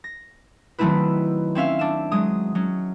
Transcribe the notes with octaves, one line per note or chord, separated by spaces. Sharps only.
A#6
D#3 F#3 A3 C4 E4 B4
C4 C#4 E5 F5
D4 E7
F#3 G#3 D#6
F#3 C#4